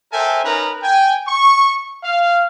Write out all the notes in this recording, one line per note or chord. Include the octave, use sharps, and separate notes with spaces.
A4 A#4 C5 E5 G5 G#5
C#4 D#4 A#4 B4 A#5
G5 G#5
C#6
F5